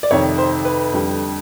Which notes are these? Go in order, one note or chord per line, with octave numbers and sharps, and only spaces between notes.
D5
F2 C3 D#3 C#5
C5
B4
F2 D3 G3